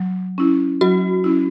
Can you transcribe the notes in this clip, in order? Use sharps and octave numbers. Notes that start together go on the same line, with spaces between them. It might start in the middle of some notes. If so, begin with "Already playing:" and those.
Already playing: F#3
C#4 E4
F#3 F#4
C#4 E4